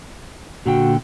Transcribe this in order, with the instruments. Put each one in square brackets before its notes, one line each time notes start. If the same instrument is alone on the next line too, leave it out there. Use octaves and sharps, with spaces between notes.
[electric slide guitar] A#2 D3 G5 [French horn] F#4